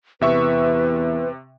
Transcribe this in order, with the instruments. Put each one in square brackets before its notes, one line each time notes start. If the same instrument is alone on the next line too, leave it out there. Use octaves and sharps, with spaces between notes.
[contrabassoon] E2 [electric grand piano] C3 E5 C#6 [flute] B4